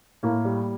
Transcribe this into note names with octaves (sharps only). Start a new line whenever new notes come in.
A2 A#3
G3